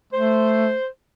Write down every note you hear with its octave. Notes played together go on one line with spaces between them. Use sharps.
A3 C5